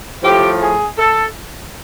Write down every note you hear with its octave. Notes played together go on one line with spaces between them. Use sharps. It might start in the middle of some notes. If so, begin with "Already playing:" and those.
A2 F3 A3 G4
G#4
A4